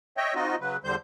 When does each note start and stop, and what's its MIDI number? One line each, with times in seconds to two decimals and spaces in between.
0.17 0.34 73
0.17 0.34 75
0.17 0.34 76
0.17 0.34 79
0.35 0.56 60
0.35 0.56 63
0.35 0.56 65
0.35 0.56 66
0.35 0.56 75
0.60 0.77 49
0.60 0.77 54
0.60 0.77 71
0.84 0.96 40
0.84 0.96 50
0.84 0.96 55
0.84 0.96 72
0.84 0.96 91